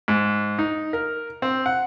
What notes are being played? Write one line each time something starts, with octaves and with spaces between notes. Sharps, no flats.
G#2
D#4
A#4
C4
F#5